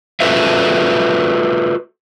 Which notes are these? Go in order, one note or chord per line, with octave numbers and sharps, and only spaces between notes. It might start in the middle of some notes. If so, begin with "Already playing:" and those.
F4 F#4 A4 B4 C5 E5